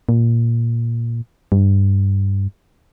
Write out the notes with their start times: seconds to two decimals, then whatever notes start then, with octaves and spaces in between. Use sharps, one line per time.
0.09 A#2
1.52 G2